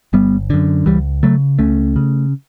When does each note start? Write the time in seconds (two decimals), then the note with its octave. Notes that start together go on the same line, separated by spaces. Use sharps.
0.13 G1 G3 B3
0.50 F#2 D3
0.86 C#2 E3 G3
1.23 C#3 F#3 A3
1.59 C#2 A3 C#4
1.96 C#3